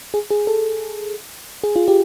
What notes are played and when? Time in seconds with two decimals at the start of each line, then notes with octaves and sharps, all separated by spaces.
0.14 G#4
0.31 G#4
0.47 A4
1.64 G#4
1.76 F4
1.88 G4